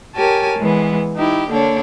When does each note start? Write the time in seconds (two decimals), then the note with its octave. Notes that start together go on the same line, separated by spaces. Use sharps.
0.14 G4 A#4 C#5 G#5 A5
0.57 E3 G#3 B3
1.16 D#4 E4 G4
1.49 D3 A#3 D4 C#5